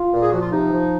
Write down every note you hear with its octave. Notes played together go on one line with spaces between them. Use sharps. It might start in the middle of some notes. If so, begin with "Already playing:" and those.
Already playing: F4
A#2
G#4
F3 F#4
F4
C3 D#4
F3